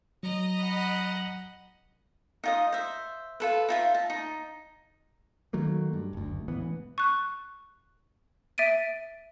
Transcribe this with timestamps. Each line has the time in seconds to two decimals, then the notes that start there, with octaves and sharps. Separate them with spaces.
0.23 F#3 D#5 A#5
0.58 F#5 B5
2.44 D#4 F4 D#5
2.72 C5 E5
3.40 F4 A4 B4
3.68 D#4 F4 E5
3.95 A5
4.10 D#4
5.53 D#3 F#3 A3 A#3
5.93 G2
6.13 F#1 D2
6.48 E1 A1 E3 B3
6.98 C#6 F#6
8.58 E5 A6 D7 D#7